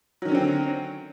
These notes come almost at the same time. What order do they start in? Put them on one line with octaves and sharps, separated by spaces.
F#3 D#3 C#4 D3 C4